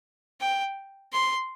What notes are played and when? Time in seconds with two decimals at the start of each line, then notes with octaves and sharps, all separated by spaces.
0.41 G5
1.13 C6